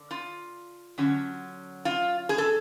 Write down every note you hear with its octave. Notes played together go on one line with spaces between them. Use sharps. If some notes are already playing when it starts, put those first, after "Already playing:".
Already playing: D3
F4
D3 F#3 C#4
F4
G#4
A4